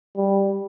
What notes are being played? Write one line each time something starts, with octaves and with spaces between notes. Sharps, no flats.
G3